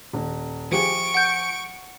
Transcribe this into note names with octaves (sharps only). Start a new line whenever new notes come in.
D#1
F3 G4 G#4 C#6 D7
F#5 G6